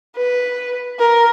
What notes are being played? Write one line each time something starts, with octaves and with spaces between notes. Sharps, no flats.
B4
A#4